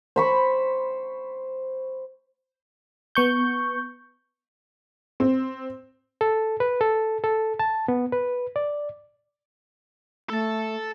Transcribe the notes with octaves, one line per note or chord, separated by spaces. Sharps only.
C5 B5 C#6
B3 C#6 G6
C4
A4
B4
A4
A4
A5
B3
B4
D5
A3 A4 A5